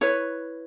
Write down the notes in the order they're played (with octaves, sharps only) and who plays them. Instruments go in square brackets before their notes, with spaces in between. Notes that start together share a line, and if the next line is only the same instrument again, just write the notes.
[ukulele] E4 B4 C#5